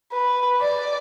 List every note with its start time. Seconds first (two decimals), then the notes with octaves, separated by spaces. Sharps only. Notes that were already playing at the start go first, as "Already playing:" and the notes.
0.12 B4
0.61 D5